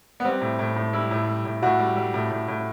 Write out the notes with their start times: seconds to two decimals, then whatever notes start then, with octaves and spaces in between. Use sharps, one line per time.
0.20 B3
0.24 G3 C4
0.41 A2
0.59 A2
0.76 A2
0.93 G3 E4
1.11 A2
1.28 G3
1.45 A2
1.62 A2 F#4
1.79 G3
1.97 G3
2.14 A2
2.31 A2
2.48 A2